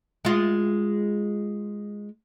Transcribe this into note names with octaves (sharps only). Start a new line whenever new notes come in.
G#3 F4